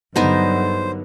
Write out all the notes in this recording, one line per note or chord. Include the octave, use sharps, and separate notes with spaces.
G2 D3 F#3 B3 D#4 A#4 C5